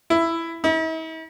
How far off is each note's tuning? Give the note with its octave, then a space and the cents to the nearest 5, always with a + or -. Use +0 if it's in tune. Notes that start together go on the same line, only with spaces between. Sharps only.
E4 +10
E4 -45